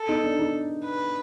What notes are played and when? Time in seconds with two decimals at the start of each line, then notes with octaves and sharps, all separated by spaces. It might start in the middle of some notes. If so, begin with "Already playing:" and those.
Already playing: A4
0.09 D#4
0.24 D4
0.39 D#4
0.85 B4